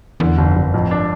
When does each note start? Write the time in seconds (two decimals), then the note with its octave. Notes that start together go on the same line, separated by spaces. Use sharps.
0.20 E2 D3
0.38 G1
0.47 F2
0.56 G1
0.74 F2 A2
0.91 D4